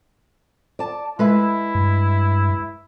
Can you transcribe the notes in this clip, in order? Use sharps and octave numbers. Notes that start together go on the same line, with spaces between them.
D5 A5
G#3 E4 B4 E5
G2